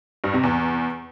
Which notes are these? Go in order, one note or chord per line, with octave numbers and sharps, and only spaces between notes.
G2
C3
E2